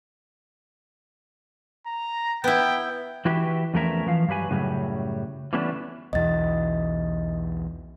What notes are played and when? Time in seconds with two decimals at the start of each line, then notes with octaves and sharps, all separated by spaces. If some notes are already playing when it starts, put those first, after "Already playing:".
1.87 A#5
2.44 B3 E4 G5
3.25 E3 E4 F#4 G4 B4 E5
3.74 E2 F3 A3 C#4 A#4 E5
4.06 E3 F3 F5
4.28 G2 F#3 G4 B4 G#5
4.49 F#2 A2 C#3 F#3 G3
5.53 E3 G3 A3 B3 C#4 D4
6.13 B1 E2 D#5 A6